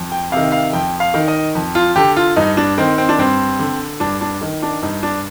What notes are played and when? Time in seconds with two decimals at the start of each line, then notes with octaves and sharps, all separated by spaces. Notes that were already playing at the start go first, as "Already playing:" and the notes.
Already playing: F2
0.12 G5
0.32 C3 D#3 F5
0.52 F5
0.73 F2 G5
1.00 F5
1.14 D#3
1.28 D#5
1.55 F2
1.75 F4
1.96 D3 G4
2.16 F4
2.36 G2 D#4
2.57 D4
2.78 D#3 C4
2.98 C4
3.09 D4
3.18 G2 C4
3.59 D3
4.00 G2 D4
4.21 D4
4.41 D#3
4.62 D4
4.82 G2 D#4
5.03 D4